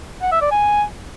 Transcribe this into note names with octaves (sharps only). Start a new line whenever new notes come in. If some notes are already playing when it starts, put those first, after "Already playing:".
F#5
E5
D5
G#5